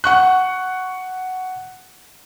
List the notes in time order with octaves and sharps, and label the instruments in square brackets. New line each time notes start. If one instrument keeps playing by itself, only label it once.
[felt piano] F#5 C#6 F#6